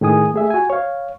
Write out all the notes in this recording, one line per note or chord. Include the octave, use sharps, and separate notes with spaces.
A2 D#3 G#4 G#5 D#6
A3 G#4 E5
F#4 G#5
C#5 F5